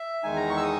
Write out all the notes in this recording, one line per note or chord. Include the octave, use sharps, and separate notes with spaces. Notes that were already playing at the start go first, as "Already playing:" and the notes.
Already playing: E5
E2 D#3 G#3 D#4 G#5
A#5
C#6
E6
D#6